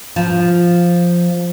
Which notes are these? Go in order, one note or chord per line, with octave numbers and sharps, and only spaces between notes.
F3